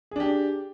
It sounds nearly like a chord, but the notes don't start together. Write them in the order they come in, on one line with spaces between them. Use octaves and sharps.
G#4 D4 G4